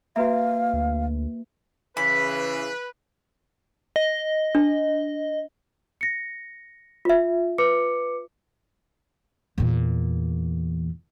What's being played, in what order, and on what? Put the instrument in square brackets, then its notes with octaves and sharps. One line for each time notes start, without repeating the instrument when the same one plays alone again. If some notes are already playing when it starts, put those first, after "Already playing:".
[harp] A#3 [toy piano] F#4 B4 E5 [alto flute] F5
[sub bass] D2
[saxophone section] C#3 E3 [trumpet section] B4 [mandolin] B5
[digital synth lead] D#5
[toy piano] D4
[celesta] A#6 C#7
[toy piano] F4 E5
[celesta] B4 D6 C#7
[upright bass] E2 A#2